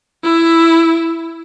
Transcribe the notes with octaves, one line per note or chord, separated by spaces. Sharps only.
E4 E5